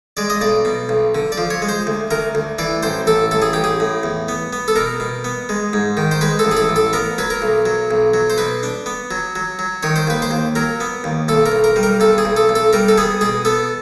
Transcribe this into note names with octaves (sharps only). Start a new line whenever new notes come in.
G#3 D5
D#5
B1 D5
B2
B1
D3
D5
F3
C#5
G#3
C5
D2
D2 A#4
D2
E3 D5
A1 C5
A1 A4
A1 A4
G#4
A1 G4
G#4
A2
E2
B3
B3
A4
B2 A#4
B2
B3
G#3
G#2
D#3
C5
G#3 B4
A4
A1
G#4
A4
A1
A4
B3 A#4
F#3 B4
A#4
B1
F#3
B1
F#3
C5
B2 B4
D4
B3
F#3
F#3
F#3
D#3 C#5
C5
D#2 B4
C5
D#2
F#3 A#4
B3
D#2
B1 A4
A#4
B1
A#4
G3
A#4
B1 A4
G#4
B1
A4
B1
A4
G3 A#4
A4
B3 G#4
B2 G#4
B3 A4